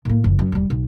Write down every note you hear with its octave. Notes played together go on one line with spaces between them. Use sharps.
A2 A#3
F#1 F2
F#2
E1 G3
B1